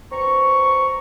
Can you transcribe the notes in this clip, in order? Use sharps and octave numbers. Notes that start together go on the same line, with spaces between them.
G2 C4 A#5 C#6